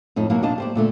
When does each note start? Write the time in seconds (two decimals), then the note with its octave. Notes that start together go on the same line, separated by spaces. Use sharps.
0.16 F2 A2 D#4
0.30 B2 F#3 A#3 F#4 F5
0.42 B2 D4 D5 D#5 F5 A5
0.58 G4 C5 D5
0.75 A#2 D3 A3